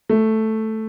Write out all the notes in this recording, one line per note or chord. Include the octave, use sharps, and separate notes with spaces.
A3